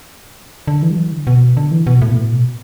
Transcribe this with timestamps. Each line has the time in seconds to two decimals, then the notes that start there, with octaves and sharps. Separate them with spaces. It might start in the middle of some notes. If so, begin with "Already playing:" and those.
0.67 D3
0.82 E3
0.91 G3
0.97 E3
1.12 D3
1.27 B2
1.57 D3
1.71 E3
1.87 B2
2.02 A2
2.11 B2
2.17 A2
2.31 B2